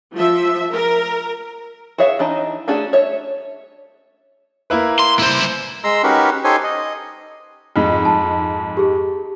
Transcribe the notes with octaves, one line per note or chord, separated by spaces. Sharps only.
F3 E5
A#4
F#4 G#4 C#5 E5 F5
E3 D4 D#4 D#5
A3 C#4 D4 F#4 G#4
C#5 E5
A#3 E4 B4
C6
E4 C5
G#3 A#5 C6 E6
C#4 D#4 F#4 G4 A#4 B4
D#4 G4 A4 C5 C#5 G#5
D#5
F2 G#2
A5
G4 G#4